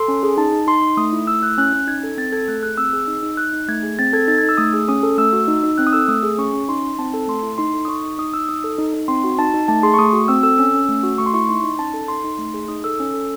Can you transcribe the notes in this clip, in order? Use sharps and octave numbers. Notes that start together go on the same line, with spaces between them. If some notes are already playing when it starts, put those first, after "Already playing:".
Already playing: A4 C6
C#4
G#4
D#4 A5
D#4
D#4 C6
D#4
A3 D#6
E4
A3 E6
E4 F#6
C#4 F#6
C#4
D#4 G#6
A4
C4 A6
A4 G#6
A3 F#6
G#4 F#6
C4 E6
G#4
D#4
D#4
D#4 F#6
D#4
A3 G#6
G#4
C4 A6
A4 G#6
D#4 A6
D#4 G#6
E6
A3 D#6
G#4
C#4 D#6
A4
A3 E6
F#4
D#4
D#4
C4 F#6
D#6
A4 E6
A3 D#6
G#4
C#4 C#6
C#4
D#4 C6
D#4
C4 A5
A4 A5
A3 C6
E4
D#4 C6
A4
D#6
D#4 C#6
D#4
D#4 D#6
D#4 E6
D#4 D#6
A4
D#4
D#4
C4 C6
F#4
D#4 A5
D#4
A3 A5
G#4 C6
C#6
A3 D#6
F#4
C4 E6
A4 E6
C#4 E6
C#4
A3
F#4
A3 C#6
C6
E4 C#6
D#4 C6
D#4
C#4 A5
A4
D#4 C6
D#4
A3
G#4
D#4 D#6
A4 E6
C#4
A4